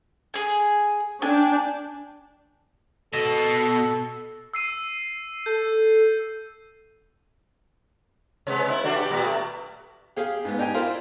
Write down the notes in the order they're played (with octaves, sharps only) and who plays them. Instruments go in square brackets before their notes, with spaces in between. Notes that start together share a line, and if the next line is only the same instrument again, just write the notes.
[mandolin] G#4 G#5
[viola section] D4 G5 [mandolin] G#5
[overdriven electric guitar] B2 [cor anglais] A4
[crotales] E6 C7 D#7
[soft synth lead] A4 [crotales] G6
[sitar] C3 G#3 B3
E4
A3 D4 F#4
G4
A#2 G3 B3
A3
[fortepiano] G4 G#4 F5
G#2 B3
D4 D#4 G4 G5 G#5
E4 F4 A#4 C5 F5